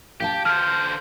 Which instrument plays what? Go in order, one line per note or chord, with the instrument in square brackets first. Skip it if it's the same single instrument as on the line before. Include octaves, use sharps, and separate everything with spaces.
[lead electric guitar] G4 [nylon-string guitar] F5 G5 A5
[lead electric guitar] D3 C5 [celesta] F6